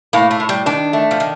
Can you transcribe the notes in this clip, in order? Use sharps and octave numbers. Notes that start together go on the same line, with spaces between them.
A2 A#3
A3
A2
G3
D#3 D4
A3
F3
D#3